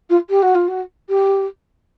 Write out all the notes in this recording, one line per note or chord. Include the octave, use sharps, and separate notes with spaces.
F4
G4
F#4
F4
F#4
G4